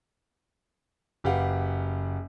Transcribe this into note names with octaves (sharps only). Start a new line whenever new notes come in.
F#1 G4 B4 F5 F#5